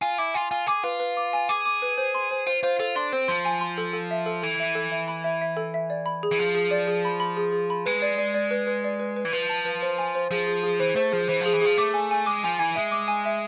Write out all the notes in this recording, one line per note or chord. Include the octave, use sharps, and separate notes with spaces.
F4 G#5
E4 D6
F4 G#5
F4 G#5
G#4 D6
F4 B4
B4
D6
G#5
G#4 D6
D6
B4
C5
C6
C5
F4 C5
F4 C5
F4 A4
D4 C6
C4 C5
F3 C6
G#5
C6
A4
A4
E5
A4
E3 A4
E5
A4
E5
B5
E5
E5
A4
E5
D5
B5
G#4
E3
F3 G#4
G#4
D5
G#4
B5
B5
G#4
G#4
B5
G#3 B4
D5
D5
D5
B4
B4
D5
B4
B4
E3
F3 B4
A5
B4
C5
G#5
C5
F3 G#4
G#4
G#4
E3 C5
A3 C5
F3 G#4
E3 C5
F3
G#4
E3
F3 G#4
A3 D6
G#5
G#5
G#3 D6
F3 G#5
E3 G#5
G#3 E5
D6
G#5
E5